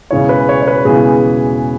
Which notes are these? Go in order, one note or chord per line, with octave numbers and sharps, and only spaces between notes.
E1 E2 C#3 E3 C#5
B4
C#5
C#5
B4
E1 E2 C#3 E3 G#4